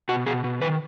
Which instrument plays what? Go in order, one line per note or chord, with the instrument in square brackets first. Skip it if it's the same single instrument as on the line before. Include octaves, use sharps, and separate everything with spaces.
[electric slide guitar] B2 F#4
B2 G#4
B2
D#3 B4